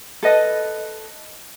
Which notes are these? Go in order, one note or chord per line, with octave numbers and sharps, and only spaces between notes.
A4 B4 D#5